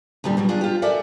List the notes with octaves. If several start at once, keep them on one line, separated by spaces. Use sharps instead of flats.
D2 A#2 D3 G3
B2 F#3 G3
D4 F4 G#4
F4 G4
A4 A#4 D5 E5 F#5 G#5